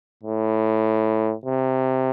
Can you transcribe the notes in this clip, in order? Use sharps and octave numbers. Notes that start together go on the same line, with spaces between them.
A2
C3